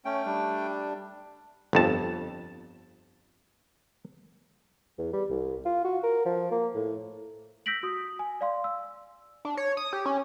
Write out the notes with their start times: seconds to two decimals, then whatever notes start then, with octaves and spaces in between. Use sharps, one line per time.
0.05 A3 C#4 G5
0.25 G3 D4
1.73 G1 F2 A5
4.98 E2
5.13 G3
5.30 C2
5.65 F4
5.85 F#4
6.03 A#4
6.25 F3
6.51 A#3
6.75 A2
7.66 E6 G6 A#6 B6 D7 F#7
7.83 F#4 D#6
8.19 G#5
8.41 D5 F5 C6
8.64 E6
9.45 D4
9.57 C#5
9.77 D#6
9.93 G4
10.06 C#4